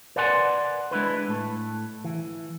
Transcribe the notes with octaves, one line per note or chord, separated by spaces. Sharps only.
A#4 B4 D5 F#5 G#5 C6
G#3 D4 E4 B4
A2 A3
E3